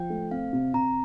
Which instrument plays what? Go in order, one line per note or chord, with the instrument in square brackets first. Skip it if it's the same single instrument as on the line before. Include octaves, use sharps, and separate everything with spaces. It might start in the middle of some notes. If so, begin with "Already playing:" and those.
Already playing: [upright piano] F3 [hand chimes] G5
[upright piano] A3
[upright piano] C4 [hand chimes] F5
[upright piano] C3
[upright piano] C3 [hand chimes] A#5